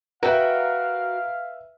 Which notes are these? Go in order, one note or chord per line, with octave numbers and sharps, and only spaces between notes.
F#4 A#4 B4 E5 F5 G5